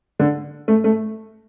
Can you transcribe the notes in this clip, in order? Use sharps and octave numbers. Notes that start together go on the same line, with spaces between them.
D3
A3
A3